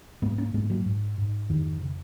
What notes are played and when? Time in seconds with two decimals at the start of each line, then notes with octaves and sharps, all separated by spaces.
0.22 G#2 G#3 B3
0.38 A#3 C#4
0.54 G#2 G#3 B3
0.70 F#3 A#3
0.86 G#2
1.18 G#2
1.50 F2 D#3
1.82 C#3